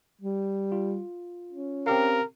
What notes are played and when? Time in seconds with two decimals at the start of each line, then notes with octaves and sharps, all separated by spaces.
0.21 G3
0.72 F4
1.52 C#4
1.87 C4 G4 A#4 F5